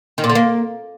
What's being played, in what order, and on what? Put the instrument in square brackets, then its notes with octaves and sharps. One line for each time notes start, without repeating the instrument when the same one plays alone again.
[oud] D#3
A#2
D3
A#3